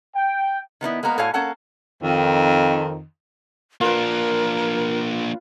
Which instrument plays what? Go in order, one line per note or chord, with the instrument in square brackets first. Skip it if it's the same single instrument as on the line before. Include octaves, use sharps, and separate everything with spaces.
[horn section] G5
[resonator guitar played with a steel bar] D#3 B3 D#4 E4
G#3 A#3 B3 A#4 B4
A2 F#4 A4 C#5 F5 G#5
A#3 C#4 A4 F#5 A5
[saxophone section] F2 D#3
[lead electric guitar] A#3 D4 [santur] F4 B4 [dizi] A#4